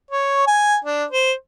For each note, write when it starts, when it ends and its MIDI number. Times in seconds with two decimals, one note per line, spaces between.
0.11 0.44 73
0.47 0.77 80
0.84 1.04 62
1.11 1.32 72